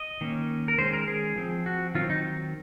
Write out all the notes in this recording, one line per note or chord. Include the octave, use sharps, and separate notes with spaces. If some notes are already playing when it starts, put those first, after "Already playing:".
Already playing: D#5
D#3 A#3 C#4
A#4
D#3 G#3 C#4 C5
A#4
G#4
F3 C4
F#4
D#3 F#3 C4 F4
D#4